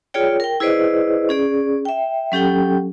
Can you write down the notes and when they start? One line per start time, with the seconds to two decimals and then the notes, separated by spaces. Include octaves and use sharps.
0.14 F4 G#4 C#5 D5 G5
0.40 A#4 G5
0.60 E4 G#4 B4 C5 D5 D#5
1.29 C#4 G#4 D5
1.85 E5 G5
2.32 F#3 C#4 G4 A4 G5